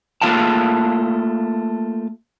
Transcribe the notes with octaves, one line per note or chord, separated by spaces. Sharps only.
A3 A#3 F4 F5 G5 A5